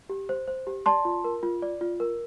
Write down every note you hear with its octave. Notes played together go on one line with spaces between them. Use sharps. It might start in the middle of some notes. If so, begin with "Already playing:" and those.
G4
C5
C5
G4
D5 A5 C6
F4
A#4
F4
D5
F4
A#4